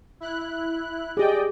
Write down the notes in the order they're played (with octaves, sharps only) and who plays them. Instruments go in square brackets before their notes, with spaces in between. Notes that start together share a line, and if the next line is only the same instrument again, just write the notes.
[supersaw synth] E4 F#6
[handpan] G4 G#4 [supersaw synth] D5 D#5 G5